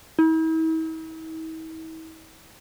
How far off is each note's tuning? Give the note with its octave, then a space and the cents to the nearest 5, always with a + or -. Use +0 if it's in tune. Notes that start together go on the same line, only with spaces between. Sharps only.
E4 -45